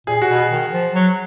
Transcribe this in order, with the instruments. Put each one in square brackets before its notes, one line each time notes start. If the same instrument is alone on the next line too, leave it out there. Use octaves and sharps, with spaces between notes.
[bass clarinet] A#2 [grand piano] G#4
[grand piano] F#4
[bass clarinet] B2
[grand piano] G#4
[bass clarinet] D#3
F3
F#3